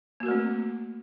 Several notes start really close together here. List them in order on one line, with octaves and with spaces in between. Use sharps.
A#3 F#4 A#4 A3 C4